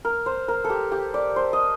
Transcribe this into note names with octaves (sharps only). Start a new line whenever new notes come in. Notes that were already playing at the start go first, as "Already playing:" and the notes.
A#4
C5
A#4
A4
G4
G4
D5
C5
D#5